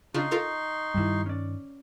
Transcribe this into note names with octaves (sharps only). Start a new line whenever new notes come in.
C#3 D4 D#4 F4 C6 C#6
F4 A4 A#4
G2 D#3 G3 E4
C#4 D5